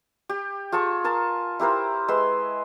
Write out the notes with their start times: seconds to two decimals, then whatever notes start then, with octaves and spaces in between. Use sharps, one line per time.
0.29 G4
0.72 F4 G#4 A5 C#6
1.04 A#4 G#5 A5
1.60 E4 G4 A#4 C5
2.08 G#3 B4 C6 E6